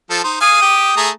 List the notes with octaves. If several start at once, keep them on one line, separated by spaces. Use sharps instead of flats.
F3 A4
D#4 C5
F5 G#5 D#6
G4 G5
A3 G#4 A#5